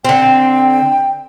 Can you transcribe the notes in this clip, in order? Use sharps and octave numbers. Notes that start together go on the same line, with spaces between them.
D3 C4 G5